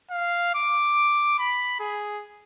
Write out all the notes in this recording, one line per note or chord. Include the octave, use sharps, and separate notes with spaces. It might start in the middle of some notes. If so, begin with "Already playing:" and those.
F5
D6
B5
G#4